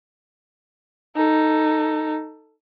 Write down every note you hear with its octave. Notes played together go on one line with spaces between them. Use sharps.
D#4 A4